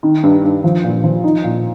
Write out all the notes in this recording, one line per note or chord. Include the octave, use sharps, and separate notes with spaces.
D#3
G2
G2
F3
A#2
F3
D#4
A#2